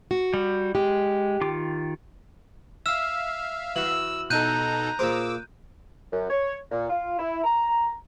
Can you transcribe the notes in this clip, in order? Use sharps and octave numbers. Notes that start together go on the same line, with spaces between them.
F#4
G3
G#3 G4
D#3 F4 D6
E5 F5 E6 F6 E7
E3 F#4 E6 F#7
B2 D#4 A4 A#5 F#6 G6 D#7
A#2 G#4 C5 D6 E6
F#2
C#5
A#2
F4
E4
A#5